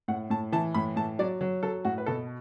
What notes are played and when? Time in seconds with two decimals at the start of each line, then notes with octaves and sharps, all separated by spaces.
0.08 A2 F#5
0.30 A2 A5
0.52 E3 A5
0.74 A2 B5
0.96 A2 A5
1.19 F#3 D5
1.41 F#3
1.63 F#3 A4
1.85 A2 F#4
1.98 B4
2.06 B2 A4